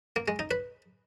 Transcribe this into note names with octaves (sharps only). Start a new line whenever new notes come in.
A#3
G#3
D#4
B4